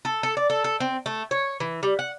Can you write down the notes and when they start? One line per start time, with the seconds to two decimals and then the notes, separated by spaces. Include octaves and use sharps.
0.05 A4
0.23 A4
0.37 D5
0.50 A4
0.64 A4
0.80 C4
1.06 A3
1.31 C#5
1.60 E3
1.83 G3
1.99 F#5